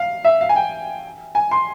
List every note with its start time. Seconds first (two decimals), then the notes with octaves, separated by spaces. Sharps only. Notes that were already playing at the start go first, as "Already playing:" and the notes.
Already playing: F5
0.25 E5
0.41 F5
0.49 G#5
0.56 G5
1.35 G#5
1.51 C6